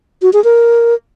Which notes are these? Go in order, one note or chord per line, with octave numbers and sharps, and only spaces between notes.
F#4
G#4
A#4